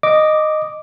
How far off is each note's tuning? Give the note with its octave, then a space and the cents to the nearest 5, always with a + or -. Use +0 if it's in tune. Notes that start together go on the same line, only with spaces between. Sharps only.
D#5 -10 D6 +0